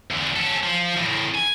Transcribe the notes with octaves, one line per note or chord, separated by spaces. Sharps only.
E2 D3
C#4 A4
F3
E2 A2
G#5